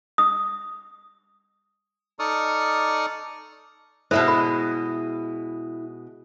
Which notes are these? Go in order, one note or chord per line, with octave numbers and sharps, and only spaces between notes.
D#6
D#4 A4 D5 C#6 D#6 F6
B2 G#3 E4 C5 E5 A5
B5